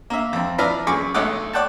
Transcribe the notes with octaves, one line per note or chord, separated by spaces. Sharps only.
A#3 E5
F2 C4
F3 D4 E4 B4 A#5 F6
F#2 G#4 C#6 D6
B1 A3 C#5 D#5 F#5 D6
C#5 D5 F#5 G5 A5